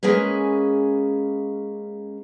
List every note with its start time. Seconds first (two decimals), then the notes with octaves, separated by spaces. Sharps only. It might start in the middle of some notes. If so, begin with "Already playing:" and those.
0.03 G#3 A#3 C#4 G#4 B4